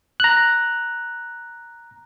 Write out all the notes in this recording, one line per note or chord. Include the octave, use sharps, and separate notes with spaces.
A#5 F#6